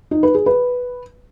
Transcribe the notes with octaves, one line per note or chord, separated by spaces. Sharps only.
D#4
B4
G#4
B4